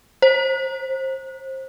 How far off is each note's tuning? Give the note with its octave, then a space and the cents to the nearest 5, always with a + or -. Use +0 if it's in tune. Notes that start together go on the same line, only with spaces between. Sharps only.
C5 +25